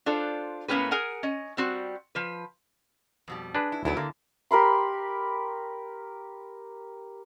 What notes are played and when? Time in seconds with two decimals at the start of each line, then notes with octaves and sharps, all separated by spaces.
0.06 D4 F4 A4 C5
0.68 A2 A#3 B3 C#4 G4 B4
0.91 G#4 A#4 F#5 G#5
1.23 C#4 D#5
1.57 G3 C4 F#4
2.15 F3 B4
3.28 F2 B2 G3
3.55 D4 G#4 B4
3.72 E4
3.85 D2 F#3 B3 E4
3.97 D3 A#3
4.51 G4 A#4 B5 C6